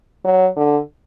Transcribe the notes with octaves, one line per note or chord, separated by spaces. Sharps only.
F#3
D3